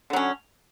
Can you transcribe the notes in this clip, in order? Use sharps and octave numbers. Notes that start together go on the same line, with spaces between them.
D3 F#3 C#4